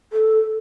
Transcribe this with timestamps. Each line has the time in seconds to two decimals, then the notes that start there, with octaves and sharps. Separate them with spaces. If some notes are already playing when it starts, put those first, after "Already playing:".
0.13 A4